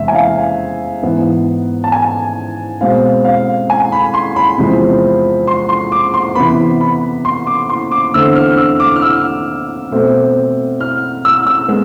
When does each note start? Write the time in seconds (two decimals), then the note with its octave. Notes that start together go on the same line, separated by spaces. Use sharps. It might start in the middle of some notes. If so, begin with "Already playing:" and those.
Already playing: E2 C3 E3 G#3 E5
0.08 G#5
0.14 F5
1.03 G#2 E3 B3
1.84 A5
1.92 G#5
2.81 B2 G#3 C4 F5
3.25 F5
3.70 G#5
3.92 B5
4.14 C6
4.36 B5
4.58 E2 C3 F3 G#3 C4
5.47 C6
5.69 C6
5.92 D6
6.14 C6
6.35 C3 E3 B3 B5
6.81 B5
7.25 C6
7.47 D6
7.70 C6
7.92 D6
8.14 E2 D3 A3 C4 E6
8.35 F6
8.57 E6
8.80 D6
8.96 F6
9.02 E6
9.91 B2 A3 C4
10.80 F6
11.25 E6
11.47 E6
11.68 G#3 B3